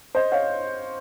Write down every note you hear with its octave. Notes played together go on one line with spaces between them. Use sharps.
C5 D#5
C#5 F5